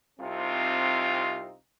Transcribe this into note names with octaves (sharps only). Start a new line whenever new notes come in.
C2 C3 C4 D#4 F4